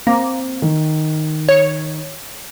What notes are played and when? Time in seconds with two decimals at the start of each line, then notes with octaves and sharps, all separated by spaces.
0.07 A#3 C4
0.62 D#3
1.49 C#5